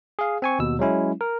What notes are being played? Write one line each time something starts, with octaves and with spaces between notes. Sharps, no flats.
G#4 F5
C4 G#5 C#6
D#2 B2 E6
F#3 G#3 C#4 E4
A#4